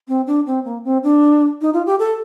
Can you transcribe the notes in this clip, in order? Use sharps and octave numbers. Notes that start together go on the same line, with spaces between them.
C4
D4
C4
A#3
C4
D4
D#4
F4
G4
A4